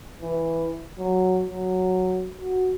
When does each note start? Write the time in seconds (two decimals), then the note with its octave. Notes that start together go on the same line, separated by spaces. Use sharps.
0.22 E3
0.99 F#3
1.50 F#3
2.38 F#4